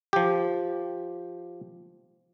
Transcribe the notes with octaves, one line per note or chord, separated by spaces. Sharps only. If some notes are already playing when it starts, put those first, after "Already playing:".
F3 G4